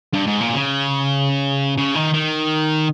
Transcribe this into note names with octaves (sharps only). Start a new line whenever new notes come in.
G2
G#2
A#2
C#3
C#3
D#3
D#3